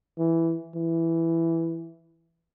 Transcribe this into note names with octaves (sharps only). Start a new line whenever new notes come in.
E3
E3